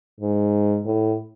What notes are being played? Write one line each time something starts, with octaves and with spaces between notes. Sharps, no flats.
G#2
A2